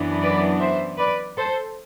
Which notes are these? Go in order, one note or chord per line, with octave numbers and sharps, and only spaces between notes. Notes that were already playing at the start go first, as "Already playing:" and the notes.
Already playing: F#2 E3 B3 D4
B4 D5
C5 E5
B4 D5
A4 C5